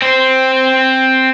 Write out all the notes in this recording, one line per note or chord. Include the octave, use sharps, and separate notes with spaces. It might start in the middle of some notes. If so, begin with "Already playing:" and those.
C4 C5